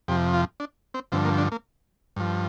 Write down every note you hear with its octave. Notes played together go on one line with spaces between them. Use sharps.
F2 C3 F3 G4
F4
D4
C4
G2 D3 F3 C4
A#3
D4
A#3
G2 F3